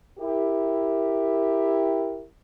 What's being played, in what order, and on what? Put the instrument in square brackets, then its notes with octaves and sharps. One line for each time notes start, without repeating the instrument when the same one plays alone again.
[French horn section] E4 G4 A#4